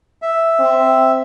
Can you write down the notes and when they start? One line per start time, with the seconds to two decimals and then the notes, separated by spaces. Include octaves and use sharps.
0.22 E5
0.60 C4